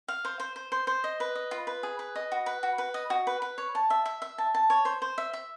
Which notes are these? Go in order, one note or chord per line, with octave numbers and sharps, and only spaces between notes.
F5
C5
C5
C5
C5
C5
D#5
B4
D#5
F4
B4
G#4
B4
D#5
F#4
B4
F#4
B4
D#5
F#4
B4
B4
C#5
A5
E5
E5
E5
A5
A5
C#5
C5
C5
E5
E5